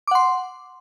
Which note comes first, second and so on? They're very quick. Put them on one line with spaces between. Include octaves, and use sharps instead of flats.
D6 F#5 C6